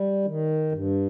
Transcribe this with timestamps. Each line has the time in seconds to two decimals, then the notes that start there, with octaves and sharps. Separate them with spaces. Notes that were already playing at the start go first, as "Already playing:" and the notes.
Already playing: G3
0.26 D#3
0.72 G2